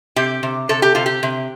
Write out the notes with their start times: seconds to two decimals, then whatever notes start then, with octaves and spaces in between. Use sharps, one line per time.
0.16 C3 G4
0.43 C3
0.69 C3 A4
0.82 G4
0.95 C3 F4
1.06 G4
1.23 C3